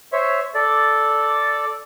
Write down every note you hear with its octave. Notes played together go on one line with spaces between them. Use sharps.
C5 C#5 E5
A4 D5